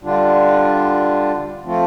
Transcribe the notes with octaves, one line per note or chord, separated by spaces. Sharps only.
D3 G3 D4 F4
F3 A3 C4 F4